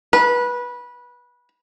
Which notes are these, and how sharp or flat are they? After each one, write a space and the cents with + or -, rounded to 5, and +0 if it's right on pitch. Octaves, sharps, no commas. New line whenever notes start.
B4 -20